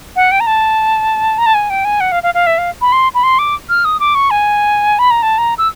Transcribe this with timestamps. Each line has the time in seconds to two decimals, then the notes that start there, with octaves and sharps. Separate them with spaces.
0.16 F#5
0.31 G5
0.40 A#5
0.47 A5
1.38 A#5
1.46 A5
1.54 G#5
1.70 G5
1.85 G#5
2.00 F#5
2.12 F5
2.23 F5
2.34 F5
2.46 E5
2.58 F5
2.81 B5
2.92 C6
3.14 B5
3.23 C6
3.39 D6
3.69 F6
3.85 D#6
4.00 D6
4.15 C#6
4.30 G#5
4.99 B5
5.11 A#5
5.22 A5
5.38 A#5
5.58 E6